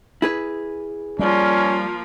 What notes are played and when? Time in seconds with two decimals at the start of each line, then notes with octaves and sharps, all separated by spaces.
0.22 E4 G#4 B4
1.19 F3 G3 A#3 C#4